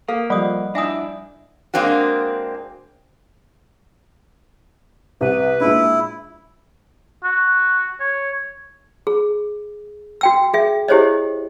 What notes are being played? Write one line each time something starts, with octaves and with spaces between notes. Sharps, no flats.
A#3 A4 F5
F3 G3 D5 D#5 F#5 B5 D#6
D4 E4 E5 G#5 D#6
G#3 A#3 C4 D4 F#4
C2 C3 B4
A#2 G#3 D4 E4
F#4
C#5
G#4
F#4 G5 E6
G#4 E5
E4 G4 G#4 C5 C#5 D#5